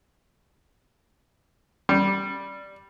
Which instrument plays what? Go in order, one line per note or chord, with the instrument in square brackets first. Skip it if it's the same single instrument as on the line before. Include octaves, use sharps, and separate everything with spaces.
[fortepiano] G3